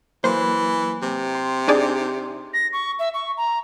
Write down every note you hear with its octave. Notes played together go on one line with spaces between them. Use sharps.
E3 F#3 A#3 C5
C3
C6
D4 D#4 G#4 D5 C6
A#6
C#6
E5
C#6
A#5